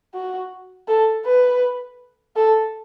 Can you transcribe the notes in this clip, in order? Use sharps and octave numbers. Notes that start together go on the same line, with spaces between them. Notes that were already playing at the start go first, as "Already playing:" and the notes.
F#4
A4
B4
A4